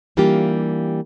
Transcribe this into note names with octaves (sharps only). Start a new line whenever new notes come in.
E3 G3 A#3 D4 F4 G4